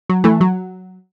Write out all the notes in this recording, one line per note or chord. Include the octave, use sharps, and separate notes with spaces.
F#3
E3 A3
F#3